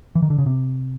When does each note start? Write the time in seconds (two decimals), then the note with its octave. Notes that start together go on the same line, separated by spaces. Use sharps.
0.15 E3
0.22 D#3
0.30 D3
0.38 C#3
0.46 C3